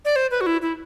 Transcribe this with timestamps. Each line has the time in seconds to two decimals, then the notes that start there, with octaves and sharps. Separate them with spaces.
0.05 D5
0.16 C5
0.31 B4
0.41 F#4
0.47 E4
0.62 E4